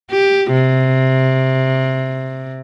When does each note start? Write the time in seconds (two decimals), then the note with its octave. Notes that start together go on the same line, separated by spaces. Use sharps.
0.11 G4
0.52 C3